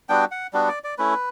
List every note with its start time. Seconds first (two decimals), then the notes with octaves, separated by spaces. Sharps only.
0.09 G3 B3 D4 F#4 G5
0.31 F#5
0.53 G3 B3 D4 F#4
0.68 D5
0.84 D5
0.98 A3 C#4 E4 B4